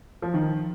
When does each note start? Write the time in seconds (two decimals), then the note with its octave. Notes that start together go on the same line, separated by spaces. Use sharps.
0.22 F3
0.34 D#3